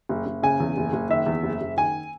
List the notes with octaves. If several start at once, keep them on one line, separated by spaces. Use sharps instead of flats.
F#1
F#1
C#3 G#5
E2
F#1
F#1
D#3 E5
E2
F#1
F#1
D#3 G#5